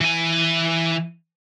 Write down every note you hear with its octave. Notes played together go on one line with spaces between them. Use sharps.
E3 G#5